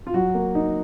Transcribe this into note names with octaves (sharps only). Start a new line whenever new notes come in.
F4
F#3 F#4
A#3
D#4